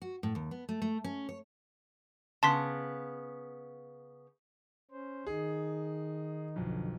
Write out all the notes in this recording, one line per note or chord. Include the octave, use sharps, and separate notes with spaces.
F#4
A2
D#2
B3
A3
A3
C#4
C#5
C#3 B3 A5 C6 B6
C#4 C5
D#3 D#4 G#4
B1 F2 D3